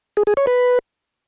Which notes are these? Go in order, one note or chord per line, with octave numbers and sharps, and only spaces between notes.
G#4
G#4
C#5
B4